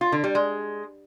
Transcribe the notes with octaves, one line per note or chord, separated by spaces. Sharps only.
F4
D3
G3
G#3